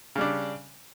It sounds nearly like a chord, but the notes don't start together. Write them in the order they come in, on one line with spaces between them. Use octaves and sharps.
C#3 G3 D4